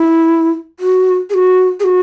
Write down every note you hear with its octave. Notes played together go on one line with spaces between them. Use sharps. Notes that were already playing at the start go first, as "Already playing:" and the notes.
Already playing: E4
F#4
G#4
F#4
G#4
F#4